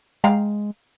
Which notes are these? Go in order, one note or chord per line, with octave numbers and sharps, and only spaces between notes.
G#3 F5 G5 A#5